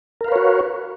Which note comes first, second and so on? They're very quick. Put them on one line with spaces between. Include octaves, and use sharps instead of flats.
A#4 F5 B4 C#5 F#4